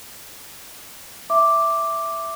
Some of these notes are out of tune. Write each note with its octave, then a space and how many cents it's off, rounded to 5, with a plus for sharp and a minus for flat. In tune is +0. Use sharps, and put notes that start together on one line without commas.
E5 +0 D6 +0